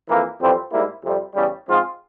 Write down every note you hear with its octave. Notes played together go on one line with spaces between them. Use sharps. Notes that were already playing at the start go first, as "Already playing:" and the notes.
F2 E3 A#3
F2 E3 G3 C4
G#2 G3 A#3 E4
F2 C3 G3
E2 C#3 G3
G#2 F3 C4 F4 G#4